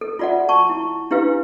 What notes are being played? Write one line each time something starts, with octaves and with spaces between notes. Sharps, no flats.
A4
F4 F#4 D5 E5 F#5
A5 C#6
E4
D4 E4 G4 B4 F5